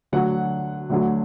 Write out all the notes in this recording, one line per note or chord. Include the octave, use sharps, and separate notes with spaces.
D2 D3 F#3 F#5
D2 D3 F#3